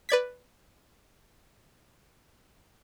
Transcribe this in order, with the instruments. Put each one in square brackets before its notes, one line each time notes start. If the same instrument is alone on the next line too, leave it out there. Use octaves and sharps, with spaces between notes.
[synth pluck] B4 D5 G#6 B6